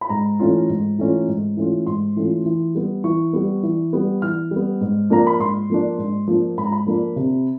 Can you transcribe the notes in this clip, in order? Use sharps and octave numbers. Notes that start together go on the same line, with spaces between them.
B5
G#2 A#5
E3 A3 C#4 F4
G#2
E3 A3 C#4 F4
G#2
E3 A3 C#4 F4
G#2 C6
E3 A3 C#4 F4
E3
G3 B3
E3 C#6
G3 B3
E3
G3 B3
E3 F6
G3
B3
G#2
F3 A#3 D4 A#5
B5
G#2 C6
F3 A#3 D4
G#2
F3 A#3 D4
G#2 B5
A#5
B5
F3 A#3 D4
C3